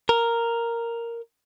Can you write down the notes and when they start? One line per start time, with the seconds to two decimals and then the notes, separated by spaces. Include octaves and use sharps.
0.09 A#4